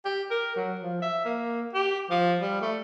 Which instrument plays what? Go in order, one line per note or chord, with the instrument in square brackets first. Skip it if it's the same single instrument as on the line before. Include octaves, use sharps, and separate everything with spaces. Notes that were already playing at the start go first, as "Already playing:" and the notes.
[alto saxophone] G4
A#4
F#3
F3
E5
A#3
G4
F3
G3
A3